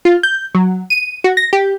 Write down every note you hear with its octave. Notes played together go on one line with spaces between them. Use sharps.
F4
G6
F#3
D#7
F#4
A#6
G4